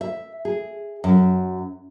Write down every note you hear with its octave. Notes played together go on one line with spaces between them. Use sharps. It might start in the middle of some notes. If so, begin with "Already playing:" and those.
E5
G#4
F#2